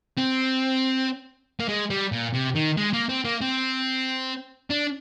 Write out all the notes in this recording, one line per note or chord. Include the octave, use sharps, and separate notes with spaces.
C4
A#3
G#3
G3
A#2
C3
D#3
G#3
A#3
C4
A#3
C4
D4